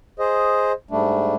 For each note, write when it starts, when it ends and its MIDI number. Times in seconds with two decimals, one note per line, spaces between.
0.19 0.72 68
0.19 0.72 72
0.19 0.72 75
0.91 1.35 44
0.91 1.35 55
0.91 1.35 57
0.91 1.35 62